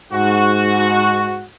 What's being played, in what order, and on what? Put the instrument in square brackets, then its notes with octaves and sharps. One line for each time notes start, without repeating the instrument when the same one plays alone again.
[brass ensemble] G#2 F#4